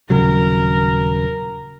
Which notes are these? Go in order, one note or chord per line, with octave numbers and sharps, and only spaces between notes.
D#1 C#3 F#3 A#4